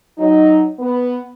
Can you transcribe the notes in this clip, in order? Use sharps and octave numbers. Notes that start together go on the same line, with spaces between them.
F#3 D#4
B3